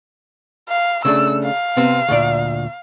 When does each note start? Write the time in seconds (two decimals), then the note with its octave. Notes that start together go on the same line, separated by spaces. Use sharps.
0.69 F5
1.05 C#3 A3 D4 E6
1.45 F5
1.77 C3 B3 C4
2.08 D2 A#2 D5